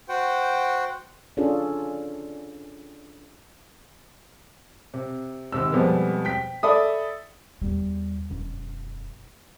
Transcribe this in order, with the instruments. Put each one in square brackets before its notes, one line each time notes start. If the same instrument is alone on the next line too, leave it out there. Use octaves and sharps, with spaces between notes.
[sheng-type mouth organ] F#4 C5 F#5 G5
[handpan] C#4 D4 F4 G#4 A4
[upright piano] C3
G#1 C3 E6
F2 B2 G3 G#3 B3
G5 B6
A4 D5 E5 B5 D#6
[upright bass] E2 G3
E1 F#2